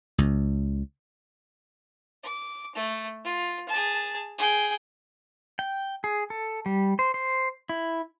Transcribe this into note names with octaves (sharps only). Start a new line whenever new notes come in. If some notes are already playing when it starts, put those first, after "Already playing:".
C#2
D6
A3
F4
G#4 A5
G#4 G5
G5
G#4
A4
G3
C5
C5
E4